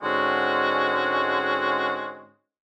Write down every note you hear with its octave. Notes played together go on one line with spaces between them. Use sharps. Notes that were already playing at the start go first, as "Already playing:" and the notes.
G#2 D3 G#3 C4 C#4 F#4